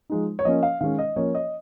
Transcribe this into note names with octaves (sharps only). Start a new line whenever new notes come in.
F3 G#3 D#4
C#5
F3 A#3 C#4 D#5
F5
D#3 G#3 C#4 F5
D#5
F3 A#3 C#4 C#5
D#5